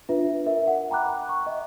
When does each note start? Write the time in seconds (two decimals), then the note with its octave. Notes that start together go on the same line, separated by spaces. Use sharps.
0.09 D4 F4 B4 E5
0.46 A#4 B4 E5
0.67 F#5
0.90 G5 A#5 B5 D6 F#6
1.29 C#6
1.46 D#5 E5